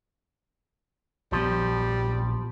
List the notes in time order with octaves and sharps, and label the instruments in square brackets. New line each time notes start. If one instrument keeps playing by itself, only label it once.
[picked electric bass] A#1 B3 [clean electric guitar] F3 [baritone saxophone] G3